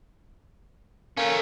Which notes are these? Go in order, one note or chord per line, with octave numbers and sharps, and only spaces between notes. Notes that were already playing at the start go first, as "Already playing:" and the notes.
A3 A#3 C#4